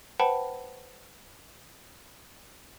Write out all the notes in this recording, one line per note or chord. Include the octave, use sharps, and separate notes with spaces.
B4 C5 F#5 G5 A5 B5